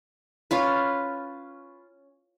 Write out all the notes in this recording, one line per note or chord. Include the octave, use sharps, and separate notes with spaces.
C#4 F4 B4